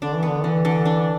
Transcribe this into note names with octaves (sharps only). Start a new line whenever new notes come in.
D3 D4
E3
B3
D3
D3 E3
D3
D4